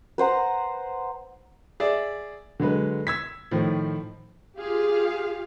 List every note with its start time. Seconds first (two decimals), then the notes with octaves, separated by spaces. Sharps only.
0.18 B4 C5 F#5 A#5
1.80 G#4 D5 E5
2.60 D3 F#3 G#3 B4
3.07 E6 G#6 B6
3.51 A2 D#3 F3
4.57 F4 G4 G#4 F5